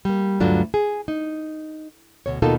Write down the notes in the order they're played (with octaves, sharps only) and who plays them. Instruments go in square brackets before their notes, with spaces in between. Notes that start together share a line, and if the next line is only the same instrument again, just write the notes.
[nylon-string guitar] G3 A#3
D2 G2 F#3 A3 D4 F4
G#4
D#4
D2 B2 C#5
D#2 B2 A#3 D#4 F4 A4